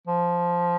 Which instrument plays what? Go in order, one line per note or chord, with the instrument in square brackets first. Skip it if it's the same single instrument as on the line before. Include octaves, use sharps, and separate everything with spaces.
[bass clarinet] F3